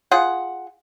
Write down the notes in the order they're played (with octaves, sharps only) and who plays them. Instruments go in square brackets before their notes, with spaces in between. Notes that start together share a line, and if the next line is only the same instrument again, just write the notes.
[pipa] F4 G#4 F#5